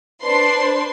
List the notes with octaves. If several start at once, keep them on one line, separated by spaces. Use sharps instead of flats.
D4 B4 C5 C6